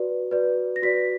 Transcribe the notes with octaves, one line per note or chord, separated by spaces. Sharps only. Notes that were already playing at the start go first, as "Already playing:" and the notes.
Already playing: F#4 B4 D5
F#4 B4 D5
A#6
F#4 B4 D5 B6